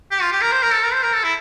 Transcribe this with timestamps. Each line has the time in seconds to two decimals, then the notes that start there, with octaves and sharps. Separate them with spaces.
0.11 G4
0.21 F4
0.32 G4
0.42 A#4
0.52 C5
0.62 A#4
0.73 A4
0.83 A#4
0.93 C5
1.03 A#4
1.14 A4
1.24 E4